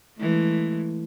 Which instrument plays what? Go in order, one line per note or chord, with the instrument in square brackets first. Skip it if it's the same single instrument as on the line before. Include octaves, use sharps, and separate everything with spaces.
[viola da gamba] E3 G#3 A3